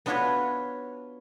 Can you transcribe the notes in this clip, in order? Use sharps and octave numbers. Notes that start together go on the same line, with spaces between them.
B3 D4 F4 F#4 B4 C#5